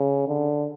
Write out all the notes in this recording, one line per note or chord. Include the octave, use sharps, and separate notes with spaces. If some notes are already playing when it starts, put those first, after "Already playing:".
Already playing: C#3
D3